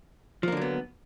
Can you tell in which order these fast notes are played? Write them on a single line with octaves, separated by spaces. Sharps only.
F3 A#3 D3 F#3 B3